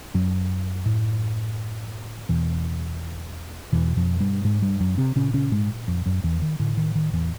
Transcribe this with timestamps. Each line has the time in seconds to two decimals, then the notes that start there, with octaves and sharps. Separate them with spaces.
0.14 F#2 F#3
0.86 A2
2.29 E2 B2 E3
3.72 E2 B2 E3
3.97 F2 F3
4.20 G2 G3
4.45 G#2 G#3
4.62 G2 G3
4.80 F#2 F#3
4.98 C3 C4
5.16 A#2 C#3 C#4
5.34 C#3 C#4
5.52 G#2 G#3
5.88 F2 F3
6.06 F#2 F#3
6.24 E2 E3
6.42 D#3
6.60 A2 D3
6.77 D#3
6.95 D#3
7.13 E2 E3